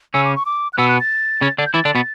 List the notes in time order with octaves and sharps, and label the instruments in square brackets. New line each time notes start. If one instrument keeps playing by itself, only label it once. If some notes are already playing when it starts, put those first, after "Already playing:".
[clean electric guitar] C#3 C#4 [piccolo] E6
[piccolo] D6
C#6
D6
F#6
[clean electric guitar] B2 B3 [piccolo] E6
[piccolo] F#6
A6
[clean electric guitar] C#3 C#4
D3 D4
[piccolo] G6
[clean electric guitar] E3 E4 [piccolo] A6
[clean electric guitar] D3 D4
B2 B3